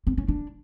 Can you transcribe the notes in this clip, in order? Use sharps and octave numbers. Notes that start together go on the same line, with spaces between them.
C4
C#4
D4